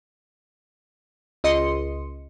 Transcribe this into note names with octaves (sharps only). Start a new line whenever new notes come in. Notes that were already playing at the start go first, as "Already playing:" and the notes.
C#2 D#5 C6 C#7